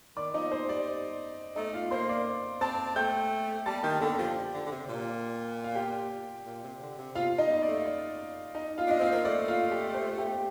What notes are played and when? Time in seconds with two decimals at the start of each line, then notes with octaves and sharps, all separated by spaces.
0.16 D#3 D5 D6
0.34 F3 D#4 D#5
0.52 G3 C5
0.69 G3 D5
1.56 A3 D#4 D#5
1.73 F4 F5
1.91 A#3 C5 C6
2.09 D5 D6
2.61 C4 A5 A6
2.96 A3 G5 G6
3.66 G3 A5 A6
3.83 D#3 G5 G6
4.01 D3 A4 A5
4.18 F3 G4 G5
4.53 D3
4.65 D3
4.71 C3
4.88 A#2
5.64 F5
5.75 G4 G5
6.46 A#2
6.63 C3
6.80 D3
6.98 C3
7.15 C3 F4 F5
7.38 D#4 D#5
7.50 G3
7.62 D5
7.68 A3
7.86 D5
8.55 D#4 D#5
8.78 F4 F5
8.87 D4 D#5
8.99 C4 F4 F5
9.12 A#3
9.25 A3 D5
9.48 F4 F5
9.71 G4 G5
9.94 C5
10.18 G4 G5